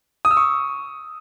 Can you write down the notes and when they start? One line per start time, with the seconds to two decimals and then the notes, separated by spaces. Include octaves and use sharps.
0.25 D#6
0.31 E6
0.37 C#6